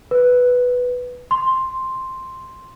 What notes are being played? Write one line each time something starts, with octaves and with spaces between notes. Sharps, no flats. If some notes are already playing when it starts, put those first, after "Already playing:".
B4
C6